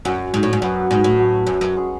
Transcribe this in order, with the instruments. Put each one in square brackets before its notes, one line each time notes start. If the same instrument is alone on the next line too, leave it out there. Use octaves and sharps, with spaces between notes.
[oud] F#2 [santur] F#3 C#4 F#4
[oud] G#2
A2
G#2
[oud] F#2 [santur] F#3 B3 F#4
[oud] G#2
A2
[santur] F#3 C#4 F#4
[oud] F#2
F#2
[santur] G#3 C#4 G#4